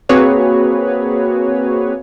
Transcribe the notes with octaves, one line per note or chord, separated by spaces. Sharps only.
A#3 C4 F#4 G#4 B4 C#5